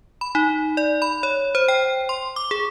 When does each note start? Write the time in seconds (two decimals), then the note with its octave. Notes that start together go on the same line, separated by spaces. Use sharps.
0.21 B5
0.35 D#4
0.77 D5
1.02 B5
1.23 C#5
1.55 C5
1.68 G5
2.09 C6
2.36 D6
2.51 G#4